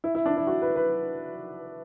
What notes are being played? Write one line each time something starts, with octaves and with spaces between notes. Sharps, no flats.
E4
E4
D4
E4
F#4
B4
B4